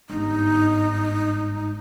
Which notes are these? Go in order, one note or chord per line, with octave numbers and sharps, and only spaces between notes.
G1 G#2 D#4